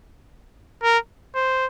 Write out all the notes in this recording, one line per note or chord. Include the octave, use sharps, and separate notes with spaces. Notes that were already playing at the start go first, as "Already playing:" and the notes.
A#4
C5